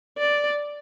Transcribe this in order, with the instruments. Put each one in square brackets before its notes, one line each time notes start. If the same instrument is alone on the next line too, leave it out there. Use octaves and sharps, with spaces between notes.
[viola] D5